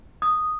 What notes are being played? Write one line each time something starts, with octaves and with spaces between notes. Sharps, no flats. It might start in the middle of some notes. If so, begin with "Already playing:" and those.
D#6